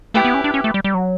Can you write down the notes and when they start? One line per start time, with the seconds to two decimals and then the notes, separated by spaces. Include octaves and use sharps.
0.14 A3 E4 G4 B4
0.25 B3
0.34 C#4
0.44 D4
0.54 C#4
0.64 A3
0.74 G3
0.84 G3
0.94 F#3